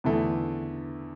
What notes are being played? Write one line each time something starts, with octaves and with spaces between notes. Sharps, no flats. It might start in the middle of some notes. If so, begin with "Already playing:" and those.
E2 D3 A3 E4